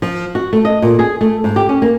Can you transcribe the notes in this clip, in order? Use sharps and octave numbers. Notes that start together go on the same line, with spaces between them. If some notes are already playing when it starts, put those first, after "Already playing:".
F3
F#4
A3
D#5
A#2
G#4
A3
G#2
G4
C#4
A#3